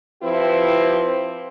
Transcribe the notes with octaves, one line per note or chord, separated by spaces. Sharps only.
F3 C4 E4 G4 B4